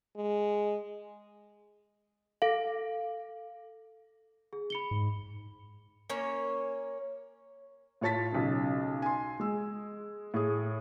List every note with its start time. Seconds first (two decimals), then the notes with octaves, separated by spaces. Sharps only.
0.16 G#3
2.42 A4 F5
4.53 G#4
4.70 B5 C#7 G7
4.91 G#2
6.10 A#3 C#4 C#5
8.01 A2 F4 C#5 A5 A6 B6
8.32 B1 C#3
9.02 G#5 C6
9.40 G#3 E6
10.34 A2 G#4